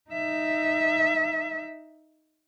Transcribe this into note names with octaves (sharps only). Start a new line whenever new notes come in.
D#4 E5